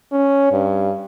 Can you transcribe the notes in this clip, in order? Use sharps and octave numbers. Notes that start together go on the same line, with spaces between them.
C#4
G2